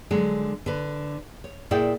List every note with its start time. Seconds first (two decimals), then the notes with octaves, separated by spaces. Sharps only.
0.11 D3 F#3 G#3
0.66 D3 B4
1.44 C#5
1.71 A#2 E4 G#4 D5 E5 G5